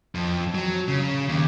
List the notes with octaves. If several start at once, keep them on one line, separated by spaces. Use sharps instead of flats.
F2
F#3
C#3
D#2